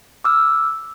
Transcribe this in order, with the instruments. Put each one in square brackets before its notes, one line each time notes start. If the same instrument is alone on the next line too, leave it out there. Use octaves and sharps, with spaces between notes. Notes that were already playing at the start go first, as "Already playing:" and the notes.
[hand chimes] D6 E6 F6